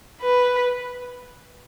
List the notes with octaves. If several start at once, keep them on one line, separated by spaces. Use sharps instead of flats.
B4